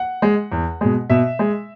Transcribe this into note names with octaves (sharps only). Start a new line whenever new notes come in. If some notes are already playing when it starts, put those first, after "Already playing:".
Already playing: F#5
G#3
E2
B2 G#3
B2 E5
G#3